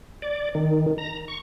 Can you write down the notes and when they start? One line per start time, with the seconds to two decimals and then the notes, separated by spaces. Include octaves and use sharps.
0.22 D5
0.55 D#3
0.98 A#5
1.28 C#6